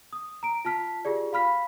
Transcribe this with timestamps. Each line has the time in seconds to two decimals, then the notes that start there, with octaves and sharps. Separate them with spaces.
0.13 D#6
0.43 A#5 D7
0.65 F4 A5 F6 B6
1.05 F4 G4 G#4 D5
1.33 F5 B5 F6 B6